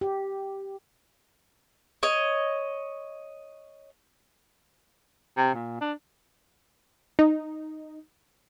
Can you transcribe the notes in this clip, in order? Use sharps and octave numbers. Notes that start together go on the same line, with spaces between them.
G4
C#5 D#5
C3
A#2
D4
D#4